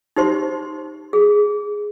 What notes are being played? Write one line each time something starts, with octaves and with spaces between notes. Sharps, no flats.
D#4 G4 C5 C6
G#4